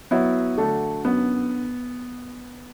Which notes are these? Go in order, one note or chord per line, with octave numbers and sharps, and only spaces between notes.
F#3 B3 E4
D3 A3 D4
F#2 B3